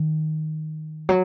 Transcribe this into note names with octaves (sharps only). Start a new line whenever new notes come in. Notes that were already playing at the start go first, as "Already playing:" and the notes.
Already playing: D#3
F#3